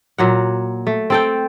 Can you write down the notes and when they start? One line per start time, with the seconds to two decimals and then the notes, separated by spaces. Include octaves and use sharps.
0.18 A#2 F#3 F#5
0.87 A3
1.10 C4 A4 G5